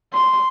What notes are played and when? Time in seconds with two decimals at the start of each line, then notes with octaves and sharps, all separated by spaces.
0.13 C6